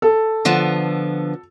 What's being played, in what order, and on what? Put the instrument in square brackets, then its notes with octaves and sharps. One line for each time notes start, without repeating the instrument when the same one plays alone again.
[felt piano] A4
[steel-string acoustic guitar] D3 F3 B3